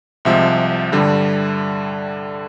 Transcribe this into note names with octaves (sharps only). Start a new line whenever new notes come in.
C2 C3 F3 G#3 E5
G2 D3 G3